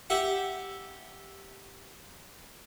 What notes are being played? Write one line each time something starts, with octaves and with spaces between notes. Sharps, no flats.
G4 E5 F#5